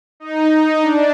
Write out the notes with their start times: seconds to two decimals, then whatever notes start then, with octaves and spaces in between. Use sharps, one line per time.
0.20 D#4
0.51 D#4
0.82 D4